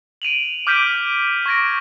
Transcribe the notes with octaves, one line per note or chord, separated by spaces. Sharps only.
D7 D#7 F7 F#7
D6 F6 G6 B6 D7 D#7
C#6 G#6 A#6 D7